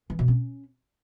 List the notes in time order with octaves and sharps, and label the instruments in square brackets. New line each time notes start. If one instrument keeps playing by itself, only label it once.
[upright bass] E3
B2
C#4